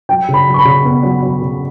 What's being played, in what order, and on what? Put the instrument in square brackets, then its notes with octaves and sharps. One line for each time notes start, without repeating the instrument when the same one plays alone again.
[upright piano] F#3 G5
C#3
B5
F#3
C#6
B5
C#3
B3
F#3
F#3
C#3